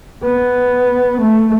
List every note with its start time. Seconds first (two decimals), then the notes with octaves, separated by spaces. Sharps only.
0.24 B3
1.21 A3